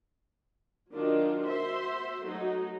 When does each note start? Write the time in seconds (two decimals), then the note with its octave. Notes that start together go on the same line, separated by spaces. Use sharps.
0.92 D#3 F#3 D4 D#4 F4
1.46 F#4 C5 E5 C6
2.22 F#3 A3 D#4 F#4